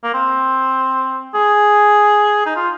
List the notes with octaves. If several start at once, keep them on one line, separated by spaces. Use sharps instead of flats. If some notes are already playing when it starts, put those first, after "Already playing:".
A#3
C4
G#4
D#4
F4